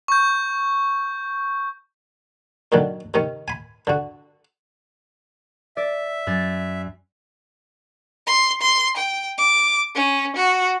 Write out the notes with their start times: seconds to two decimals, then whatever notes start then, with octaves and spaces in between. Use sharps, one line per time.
0.08 C#6 G6
2.72 A#2 D3 D#3 F#3
3.14 C3 D#3 C#4
3.48 G#5 B5
3.87 D3 F#4
5.77 D5 E5
6.27 F#2 A6
8.27 C6
8.61 C6
8.97 G5
9.38 D6
9.95 C#4
10.36 F#4